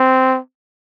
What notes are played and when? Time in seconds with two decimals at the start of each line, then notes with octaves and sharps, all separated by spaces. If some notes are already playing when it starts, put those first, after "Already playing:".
Already playing: C4